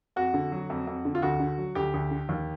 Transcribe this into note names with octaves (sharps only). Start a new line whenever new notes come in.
F2 F#4
D3
F#3
F2
F2
D3
F4
D2 F#4
D3
F#3
D2 G4
D2
D3
D#2